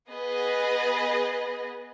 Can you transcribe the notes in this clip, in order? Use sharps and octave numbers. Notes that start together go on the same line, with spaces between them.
B3 G#4 B4 D#5